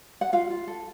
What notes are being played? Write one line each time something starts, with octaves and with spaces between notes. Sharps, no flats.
F#5
F4 F5
F4
A4